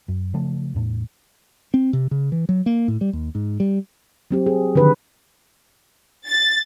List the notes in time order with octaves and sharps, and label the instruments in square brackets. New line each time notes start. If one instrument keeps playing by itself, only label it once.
[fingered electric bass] F#2
C#3 F3 A3
E2 A2
C4
C3
C#3
E3
F#3
A#3
A2
G3
D#2
G#2
G3
[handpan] F#3 C4 G4
G#4
D3 D#3 F3 B4
[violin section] A6